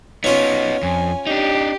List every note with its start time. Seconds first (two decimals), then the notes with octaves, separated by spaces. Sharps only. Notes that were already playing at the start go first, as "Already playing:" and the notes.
0.24 B3 C#4 D#4 F4 C#5
0.83 F2 G#5
1.27 D4 D#4 G4